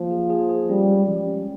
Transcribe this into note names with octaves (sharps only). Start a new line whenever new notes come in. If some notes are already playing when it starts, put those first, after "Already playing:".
Already playing: F3 A#3
G#4
G#4
G#4
G3 C#4
G#3
F3
C#4